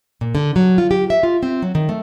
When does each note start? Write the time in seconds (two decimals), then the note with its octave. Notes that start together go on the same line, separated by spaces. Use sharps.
0.21 A#2
0.35 D3
0.56 F#3
0.78 F4
0.91 G4
1.10 E5
1.23 F4
1.43 C4
1.62 F#3
1.75 D#3
1.89 A3